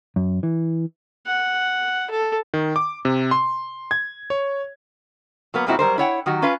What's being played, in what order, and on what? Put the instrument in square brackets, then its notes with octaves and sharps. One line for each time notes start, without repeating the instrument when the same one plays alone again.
[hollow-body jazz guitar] F#2
E3
[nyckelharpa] F#5
A4
[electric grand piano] D#3
D6
C3
C6
G#6
C#5
[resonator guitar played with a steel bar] F#3 A#3 B3
A#2 F3 G#3 C4 E4 F#4
F#3 G3 A#4 C5
E4 C#5 F#5 G5
D#3 F#3 F#4 G4
C#4 F4 B4 F5